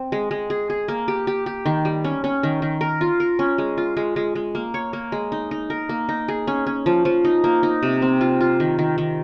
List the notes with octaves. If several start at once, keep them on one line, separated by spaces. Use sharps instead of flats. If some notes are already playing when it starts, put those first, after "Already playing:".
Already playing: C4
G#3
G#3
G#4
G#4
A#3
G4
G4
G4
D#3
G3
C#4
C#4
D#3
D#3
A#4
F4
A#4
C#4
G#3
F4
G#3
G#3
G#3
A#3
C#5
A#3
G#3
D#4
D#4
A#4
A#3
D#4
G#4
C#4
C#4
F3
F3
D#4
A#3
D#4
C3
C4
F4
F4
D#3
D#3
D#3